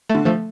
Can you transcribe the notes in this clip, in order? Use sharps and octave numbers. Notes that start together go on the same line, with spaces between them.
A3
D3
F3 A3